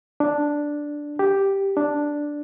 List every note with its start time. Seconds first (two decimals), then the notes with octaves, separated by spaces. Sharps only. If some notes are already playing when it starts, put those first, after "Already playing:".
0.20 D4
1.19 G4
1.77 D4